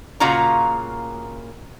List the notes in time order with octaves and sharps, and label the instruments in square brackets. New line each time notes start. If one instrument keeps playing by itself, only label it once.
[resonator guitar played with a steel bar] A#2 C#3 A#3 F4 F#4 A#5